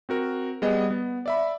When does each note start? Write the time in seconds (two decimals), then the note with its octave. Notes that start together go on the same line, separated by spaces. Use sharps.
0.09 C4 F#4 A#4
0.62 G3 B3 G#4 D#5
0.91 B3
1.26 D5 E5 B5